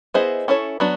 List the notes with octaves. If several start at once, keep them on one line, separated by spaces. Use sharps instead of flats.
B3 E4 G#4 C5 D#5
C#4 E4 A4 C#5
F#3 B3 D4 F#4